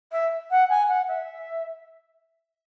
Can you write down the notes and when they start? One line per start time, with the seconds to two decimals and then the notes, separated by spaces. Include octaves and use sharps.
0.12 E5
0.50 F#5
0.69 G#5
0.88 F#5
1.08 E5